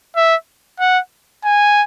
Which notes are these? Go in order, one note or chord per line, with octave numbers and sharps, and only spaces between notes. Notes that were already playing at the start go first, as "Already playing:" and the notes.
E5
F#5
G#5